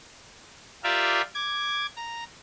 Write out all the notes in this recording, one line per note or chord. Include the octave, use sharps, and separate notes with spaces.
F4 G4 A#4 D5 E5 F5
D6 G#6
A#5